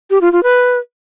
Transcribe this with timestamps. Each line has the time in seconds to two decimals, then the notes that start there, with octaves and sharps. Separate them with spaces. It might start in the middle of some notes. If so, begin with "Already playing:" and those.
0.10 G4
0.21 F4
0.32 F4
0.43 B4